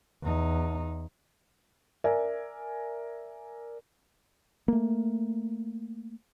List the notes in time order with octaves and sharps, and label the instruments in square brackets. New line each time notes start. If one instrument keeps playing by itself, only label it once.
[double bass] E2 D#4
[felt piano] A#4 D5 E5 G#5
[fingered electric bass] A3 A#3